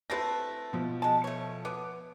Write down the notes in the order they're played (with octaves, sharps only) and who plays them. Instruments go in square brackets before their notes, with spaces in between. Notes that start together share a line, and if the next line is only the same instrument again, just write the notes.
[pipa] A3 C4 E4 [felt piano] B4 A5 A#6
[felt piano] B2 F3
[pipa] G#3 A5
A3 C#5
[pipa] B3 [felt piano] D6